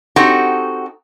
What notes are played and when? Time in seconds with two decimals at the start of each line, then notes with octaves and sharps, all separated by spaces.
0.16 C4 D#4 F#4 G4 A4